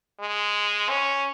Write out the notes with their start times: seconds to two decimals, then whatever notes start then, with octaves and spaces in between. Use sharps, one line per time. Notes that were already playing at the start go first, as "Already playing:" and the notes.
0.20 G#3
0.90 C#4